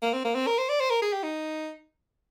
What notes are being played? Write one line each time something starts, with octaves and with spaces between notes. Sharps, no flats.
A#3
C4
A#3
C4
A#4
C5
D5
C5
A#4
G#4
G4
D#4